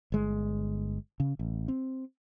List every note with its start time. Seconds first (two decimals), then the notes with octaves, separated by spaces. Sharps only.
0.12 G1 G#3
1.20 C#3
1.39 A1
1.68 C4